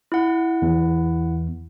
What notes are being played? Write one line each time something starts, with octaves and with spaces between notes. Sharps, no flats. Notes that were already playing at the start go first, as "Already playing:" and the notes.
E4 F#5
E2